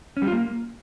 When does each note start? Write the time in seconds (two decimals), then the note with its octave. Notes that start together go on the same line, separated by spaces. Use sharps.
0.17 C#4
0.22 G3
0.27 F4
0.32 A#3